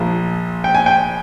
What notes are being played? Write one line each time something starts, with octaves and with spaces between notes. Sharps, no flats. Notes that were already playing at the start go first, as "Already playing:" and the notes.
Already playing: A#1 A#2 F3
G5
G#5
G5